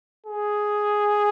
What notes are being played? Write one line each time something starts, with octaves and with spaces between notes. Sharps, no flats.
G#4